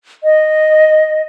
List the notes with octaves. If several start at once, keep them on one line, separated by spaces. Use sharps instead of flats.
D#5